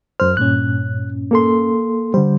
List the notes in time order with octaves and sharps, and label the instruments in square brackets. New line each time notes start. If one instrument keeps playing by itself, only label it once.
[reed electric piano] F#2 F6 [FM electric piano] C5
[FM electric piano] G2 A#2 C#4 [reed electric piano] F#6
[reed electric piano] A#3 A4 C6
[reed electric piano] D3 G3 [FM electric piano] C5